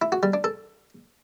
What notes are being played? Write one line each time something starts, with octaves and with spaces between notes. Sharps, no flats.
E4
F#4
G3
D4
A4